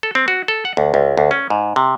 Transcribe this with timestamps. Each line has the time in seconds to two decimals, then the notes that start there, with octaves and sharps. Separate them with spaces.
0.03 A4
0.15 C4
0.28 F#4
0.48 A4
0.65 F#5
0.77 D2
0.94 C#2
1.17 D2
1.31 C#4
1.50 G#2
1.76 C3